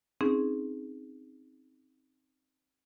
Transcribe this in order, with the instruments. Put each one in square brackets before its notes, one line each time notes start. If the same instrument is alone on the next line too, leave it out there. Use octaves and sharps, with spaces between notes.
[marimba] C4 C#4 D#4 G#4